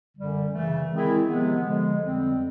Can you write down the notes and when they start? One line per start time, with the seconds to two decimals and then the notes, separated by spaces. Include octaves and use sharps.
0.16 F#2 D3 G3
0.54 C#3 E3 A3
0.91 D#3 G#3 C4 E4 G#4
1.28 C3 F3 G#3 B3
1.66 D3 F3 G#3
2.03 F2 D3 G3 C4